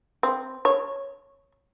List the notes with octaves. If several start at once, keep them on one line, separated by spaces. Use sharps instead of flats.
C4
C#5